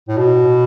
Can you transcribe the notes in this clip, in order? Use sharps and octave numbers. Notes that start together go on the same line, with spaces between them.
A2
B2